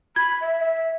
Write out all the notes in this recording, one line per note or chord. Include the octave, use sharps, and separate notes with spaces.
B5 G#6
E5
E5